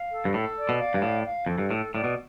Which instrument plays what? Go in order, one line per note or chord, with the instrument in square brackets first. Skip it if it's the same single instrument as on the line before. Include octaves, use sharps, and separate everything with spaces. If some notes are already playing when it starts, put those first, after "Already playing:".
Already playing: [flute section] F5
A4
[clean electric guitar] G2
[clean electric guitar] A2 [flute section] A4
[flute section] D5
[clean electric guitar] B2
[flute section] F5
[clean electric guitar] G2
[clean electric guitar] A2 [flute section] D5
[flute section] F5
[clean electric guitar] F2 [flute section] A4
[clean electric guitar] G2
[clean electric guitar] A2 [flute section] A4
[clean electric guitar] A2 [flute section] D5
[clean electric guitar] B2